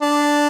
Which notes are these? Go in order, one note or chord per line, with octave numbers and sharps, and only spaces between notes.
D4